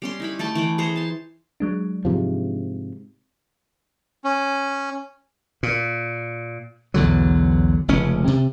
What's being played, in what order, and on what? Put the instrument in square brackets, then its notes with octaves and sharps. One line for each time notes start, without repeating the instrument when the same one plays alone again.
[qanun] G3 C#4 C6
D#4 E4 B5
A3 A4 G5 A5
E3 G5 B5
G#4 C5 C#5 A#5
A5 C6
[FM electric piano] F#3 G#3 D4
[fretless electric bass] G#2 C3 F3
[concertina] C#4
[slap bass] A#2
B1 E2 D3 F#3
F1 C#2 C#4
C3